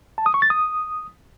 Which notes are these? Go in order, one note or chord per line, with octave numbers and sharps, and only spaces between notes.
A5
D#6
C#6
A6
D#6